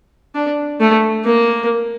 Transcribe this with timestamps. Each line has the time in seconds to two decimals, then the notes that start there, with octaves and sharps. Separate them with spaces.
0.35 D4
0.80 A3
1.24 A#3